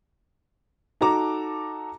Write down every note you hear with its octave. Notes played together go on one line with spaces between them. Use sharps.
D#4 F#4 A4 A5 A#5 D6